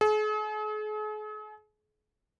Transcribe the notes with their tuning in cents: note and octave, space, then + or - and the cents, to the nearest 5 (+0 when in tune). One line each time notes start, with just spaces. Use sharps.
G#4 +45